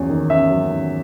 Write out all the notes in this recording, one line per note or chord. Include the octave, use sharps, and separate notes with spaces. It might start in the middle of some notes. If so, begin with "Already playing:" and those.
Already playing: E2 F#3 C#4
D#3
C#4 E5
F#3
D#3